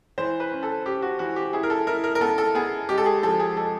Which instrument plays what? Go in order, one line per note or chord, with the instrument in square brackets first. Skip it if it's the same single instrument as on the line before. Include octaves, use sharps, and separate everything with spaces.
[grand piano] E3 C5
B4
C#4
A4
C#4 G4
F#4
E3 F#4
G4
E4 G#4
A#4
A4
E4 A#4
A#4
A#4
B3 A4
A4
B3 G#4
G#3 G4
A4
G#4
F3 A4
G#4
G#3 A4